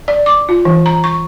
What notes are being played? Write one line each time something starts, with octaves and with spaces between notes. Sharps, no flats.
D5
D6
F4
E3
A#5
C#6